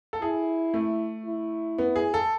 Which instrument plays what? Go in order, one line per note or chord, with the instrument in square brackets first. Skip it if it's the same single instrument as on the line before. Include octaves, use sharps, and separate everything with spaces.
[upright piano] A4
[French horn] E4 [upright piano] G#4
[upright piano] A3
[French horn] E4
[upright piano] B3
G#4
A4